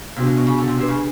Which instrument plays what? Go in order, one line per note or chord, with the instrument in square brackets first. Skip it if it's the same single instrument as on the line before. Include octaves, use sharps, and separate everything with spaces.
[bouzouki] C3 [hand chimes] B3 D4 F#4
[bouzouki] B2
B2
C#3
D3
C3
[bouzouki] C3 [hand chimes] D4 G4 B4
[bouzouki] C#3